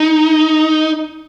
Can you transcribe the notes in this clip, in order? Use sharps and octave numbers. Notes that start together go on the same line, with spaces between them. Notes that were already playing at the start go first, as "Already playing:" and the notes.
Already playing: D#4